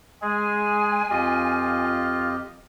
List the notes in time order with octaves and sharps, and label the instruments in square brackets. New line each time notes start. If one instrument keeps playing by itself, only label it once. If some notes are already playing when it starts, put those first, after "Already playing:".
[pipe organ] G#3 G#4 [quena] G#5
[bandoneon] F2 G4 D#5 [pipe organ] F4